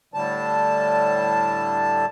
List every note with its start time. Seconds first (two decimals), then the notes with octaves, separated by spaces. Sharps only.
0.14 A2 D3 G3 A5